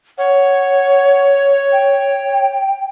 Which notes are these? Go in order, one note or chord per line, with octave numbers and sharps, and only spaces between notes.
C#5 F#5
G5